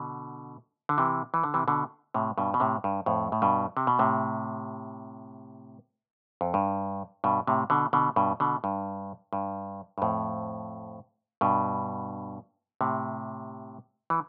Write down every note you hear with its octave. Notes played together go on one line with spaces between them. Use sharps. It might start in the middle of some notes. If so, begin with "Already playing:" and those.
Already playing: B2 D3
D3
C3 E3
E3
D3
C3 E3
B2 D3
A2 C3
G2 B2
B2
A2 C3
G2
F2 A2
A2
G2 B2
C3
B2
A2 C3
F2
G2
G2 B2
A2 C3
B2 D3
B2 D3
G2 B2
B2 D3
G2
G2
G2
F2 A2
G2 B2
A2 C3
E3